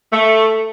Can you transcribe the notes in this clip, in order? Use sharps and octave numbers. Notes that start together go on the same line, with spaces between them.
A3